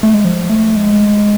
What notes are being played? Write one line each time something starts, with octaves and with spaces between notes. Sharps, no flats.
A3
G#3
F3
A3
G#3